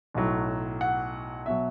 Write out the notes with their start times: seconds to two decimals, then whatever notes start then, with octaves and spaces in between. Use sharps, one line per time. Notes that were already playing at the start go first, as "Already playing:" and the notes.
0.14 B1 A2 F#3
0.81 F#5
1.46 B2 F#3 E5